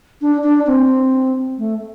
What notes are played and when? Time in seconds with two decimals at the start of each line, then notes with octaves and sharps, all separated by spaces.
0.22 D4
0.44 D4
0.67 C4
1.58 A3